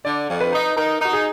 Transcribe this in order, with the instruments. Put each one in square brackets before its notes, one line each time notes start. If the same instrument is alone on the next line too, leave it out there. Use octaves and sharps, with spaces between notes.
[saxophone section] D3 [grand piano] D5
[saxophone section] F2
[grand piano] B4
[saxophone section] D#4
[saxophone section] D#4 [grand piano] A#4
[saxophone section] D#4 [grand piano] F#4
[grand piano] G#4